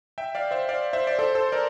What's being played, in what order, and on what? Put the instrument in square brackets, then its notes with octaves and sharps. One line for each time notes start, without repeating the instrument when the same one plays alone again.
[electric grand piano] E5 G5
D5 F5
C5 E5
D5 F5
C5 E5
D5
A4 C5
A4 C5
A#4 D5